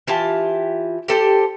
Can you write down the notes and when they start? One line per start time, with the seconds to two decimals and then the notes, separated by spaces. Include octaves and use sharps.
0.07 E3 F4 G4 A5
1.08 G4 A4 C5